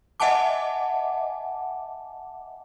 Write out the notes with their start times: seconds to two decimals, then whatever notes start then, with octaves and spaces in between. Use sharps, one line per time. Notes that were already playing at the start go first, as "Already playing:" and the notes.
0.20 D#5 E5 F#5 G#5 A5 D6